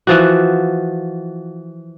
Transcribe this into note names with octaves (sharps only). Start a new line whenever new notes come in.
E3 F3 F#4